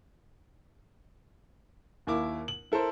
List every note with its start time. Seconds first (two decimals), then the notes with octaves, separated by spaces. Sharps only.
2.07 D#2 A#3 E4 D6
2.48 F#7
2.72 E4 A4 A#4 C5